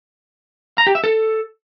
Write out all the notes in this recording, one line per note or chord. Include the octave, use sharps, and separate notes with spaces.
A#5
G4
E5
A4